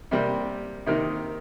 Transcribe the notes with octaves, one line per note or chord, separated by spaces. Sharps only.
C3 G3 A#3
C3 D#3 A#3 D#4